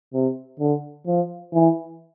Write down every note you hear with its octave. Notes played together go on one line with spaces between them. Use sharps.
C3
D3
F3
E3